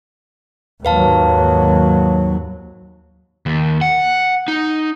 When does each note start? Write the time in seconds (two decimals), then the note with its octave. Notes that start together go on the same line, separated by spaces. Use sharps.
0.85 D#2 G#2 F#3 B4 F5 A5
3.46 D#2
3.81 F#5
4.48 D#4